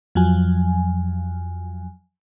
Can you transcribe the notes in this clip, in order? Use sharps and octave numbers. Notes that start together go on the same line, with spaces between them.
F2 F3 F#3 G#5